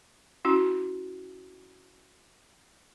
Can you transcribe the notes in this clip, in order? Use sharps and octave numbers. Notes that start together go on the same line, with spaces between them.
C#4 E4 F#4